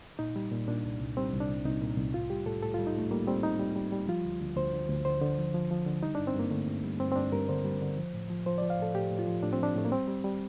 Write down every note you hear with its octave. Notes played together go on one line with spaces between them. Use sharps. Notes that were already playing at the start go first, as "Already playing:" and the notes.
A#2 D#4
G3
A#2
A#2 D4
C2
C2
G3 C4
C2
D4
C2
C2 D#4
A#2
C2
A2 F4
G3 G4
A2 A4
A2 A4
G3 F4
D#4
A2 A3
G3 A#3
G3 C4
G3 D#4
G3
G3
G3
F3 F4
D2
D2
D2 C5
D3
D2
D3 C5
D3
F3
F3
F3
D3
G3 D#4
G2 D4
C4
G2 A#3
D3 A3
G2
G3
G2 C4
C4
G2 D4
G2 A#4
D3 C5
G3
D3
F3
A2
F3
F3 C5
F3 D5
F5
A2 A4
A2 G4
A2
F4
F3
A2 D4
C4
F3 D4
A2 A3
A#3
G3 C4
G3
G3